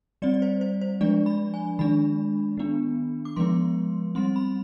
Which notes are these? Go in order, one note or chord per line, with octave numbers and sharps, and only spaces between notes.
G3 C4 D5
D5
C5
C5
C5
F3 G#3 D4 D5
B5
G#5
D#3 G#3 D4 B5
D#3 B3 D4
D6
F3 G#3 B3 C6
G3 C4 C6
B5